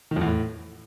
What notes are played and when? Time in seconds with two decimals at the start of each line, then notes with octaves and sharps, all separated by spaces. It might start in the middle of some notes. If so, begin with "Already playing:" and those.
0.11 D#3
0.16 F2
0.21 E2
0.26 A2